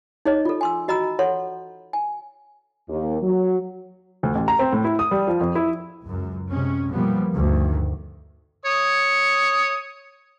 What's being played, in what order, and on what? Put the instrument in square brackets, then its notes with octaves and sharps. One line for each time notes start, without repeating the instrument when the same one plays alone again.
[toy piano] D#4 G#4 C#5 D#5
F4 A4
G#5 C6 E6
F#4 D#5 A#5 B5 E6
A4 C#5 F#5 C6
G#5
[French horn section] D#2
F#3
[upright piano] D2
A1
A#5
C4
A2
E4
D#6
G3
F3
F2
E4
[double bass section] C#2 F#2
C3 G#3 C#4
B2 F3 G3 A#3 B3
D2 G2 D#3
[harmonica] C#5 D#6